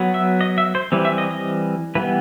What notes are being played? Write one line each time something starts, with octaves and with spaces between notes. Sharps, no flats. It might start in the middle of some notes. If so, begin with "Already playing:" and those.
Already playing: F#3 B3
E5
D#5
E5
C5
E3 G3 C4
E5
D#5
D#5
E3 G3 B3 B4